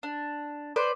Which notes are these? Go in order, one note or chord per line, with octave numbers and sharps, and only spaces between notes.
D4
B4 C5 D5